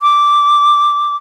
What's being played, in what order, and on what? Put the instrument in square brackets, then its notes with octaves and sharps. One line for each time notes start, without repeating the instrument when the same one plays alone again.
[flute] D6